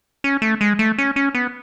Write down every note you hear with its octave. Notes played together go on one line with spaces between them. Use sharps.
C#4
A3
G#3
A3
C#4
C#4
B3